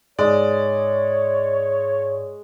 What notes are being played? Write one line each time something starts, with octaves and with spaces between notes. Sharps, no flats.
G#2 G#3 C#5 D5